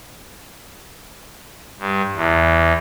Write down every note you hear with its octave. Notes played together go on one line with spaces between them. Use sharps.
G2
E2